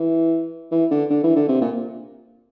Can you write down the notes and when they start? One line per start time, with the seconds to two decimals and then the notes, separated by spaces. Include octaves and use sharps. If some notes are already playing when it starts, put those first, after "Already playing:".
Already playing: E3
0.71 E3
0.91 D3
1.10 D3
1.23 E3
1.36 D3
1.49 C3
1.61 A#2